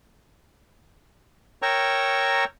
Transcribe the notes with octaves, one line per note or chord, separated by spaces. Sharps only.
A#4 C#5 G5 A#5 C#6 E6